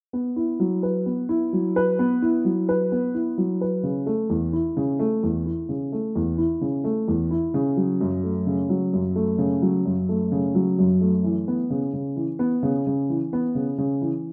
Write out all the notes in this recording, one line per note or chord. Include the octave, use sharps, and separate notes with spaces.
B3
E4
F#3
B4
B3
E4
F#3
B4
B3
E4
F#3
B4
B3
E4
F#3
B4
C#3
A3
E2
E4
C#3
A3
E2
E4
C#3
A3
E2
E4
C#3
A3
E2
E4
C#3
F#3
F#2
A3
C#3
F#3
F#2
A3
C#3
F#3
F#2
A3
C#3
F#3
F#2
A3
E3
B3
C#3
C#3
E3
B3
C#3
C#3
E3
B3
C#3
C#3
E3